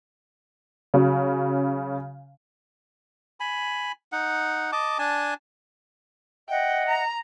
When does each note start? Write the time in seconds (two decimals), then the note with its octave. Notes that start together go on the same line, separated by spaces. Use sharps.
0.94 C#3 F#3
3.40 G#5 B5
4.12 D#4 F#5
4.72 D#5 A5 D6
4.99 D4 G#5 A5
6.49 D#5 E5 F#5 G5
6.89 A#5